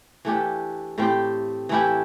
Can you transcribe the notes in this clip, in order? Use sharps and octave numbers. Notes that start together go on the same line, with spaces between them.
E3 A3 D4 G4
A2 A3 C4 G4
E3 A3 E4 G4